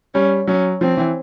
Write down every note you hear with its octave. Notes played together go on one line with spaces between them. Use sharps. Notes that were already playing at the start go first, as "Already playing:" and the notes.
G3 C#4
F#3 C#4
F3 C4
E3